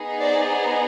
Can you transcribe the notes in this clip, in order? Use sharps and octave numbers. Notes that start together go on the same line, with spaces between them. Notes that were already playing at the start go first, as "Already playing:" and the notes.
Already playing: B3 D#4 G#4
C5 D5